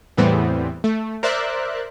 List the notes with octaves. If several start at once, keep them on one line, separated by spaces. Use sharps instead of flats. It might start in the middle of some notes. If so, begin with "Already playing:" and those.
E2 A2 E3 G3 B3 C4
A3
A#4 C5 D5 E5 F#6